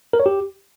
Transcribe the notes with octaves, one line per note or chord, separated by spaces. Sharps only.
A#4
C#5
G4